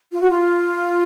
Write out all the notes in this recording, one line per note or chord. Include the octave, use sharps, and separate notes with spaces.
F4
F#4
F4